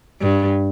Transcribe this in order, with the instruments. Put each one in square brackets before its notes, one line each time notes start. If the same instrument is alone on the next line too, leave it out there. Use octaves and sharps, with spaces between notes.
[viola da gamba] G2